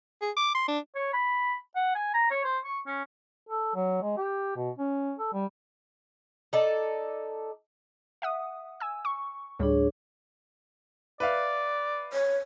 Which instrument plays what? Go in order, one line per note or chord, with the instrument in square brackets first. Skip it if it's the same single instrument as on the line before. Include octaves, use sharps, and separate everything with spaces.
[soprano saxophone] G#4
D6
C6
D4
[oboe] C#5
B5
F#5
G#5
A#5
C#5
C5
C#6
C#4
[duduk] A4
F#3
G#3
G4
B2
C#4
A4
G3
[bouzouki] D#4 A4 D5
[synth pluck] E5 F#5 D#6
G#5 E6
C#6
[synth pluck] D2 A2 G3 [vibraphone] D4 G#4 C#5
[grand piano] B4 E5 F5 [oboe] D5
[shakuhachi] C#5